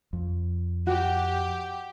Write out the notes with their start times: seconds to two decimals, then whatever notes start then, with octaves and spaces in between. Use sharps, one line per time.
0.13 F2
0.87 F#4 G4